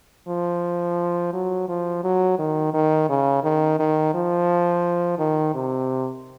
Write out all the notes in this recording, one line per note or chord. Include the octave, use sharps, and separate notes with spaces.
F3
F#3
F3
F#3
D#3
D#3
C#3
D#3
D#3
F3
D#3
C3